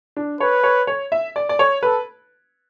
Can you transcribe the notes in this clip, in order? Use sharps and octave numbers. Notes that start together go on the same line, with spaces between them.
D4
B4 C#5
C#5
C#5
E5
D5
D5
C#5
A4 B4